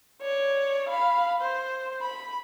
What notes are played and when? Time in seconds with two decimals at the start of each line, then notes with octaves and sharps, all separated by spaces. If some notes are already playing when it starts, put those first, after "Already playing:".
0.21 C#5 D5
0.88 F5 B5
1.41 C5
2.01 B5